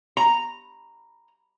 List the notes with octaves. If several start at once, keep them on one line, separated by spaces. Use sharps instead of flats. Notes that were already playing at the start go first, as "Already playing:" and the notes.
A#5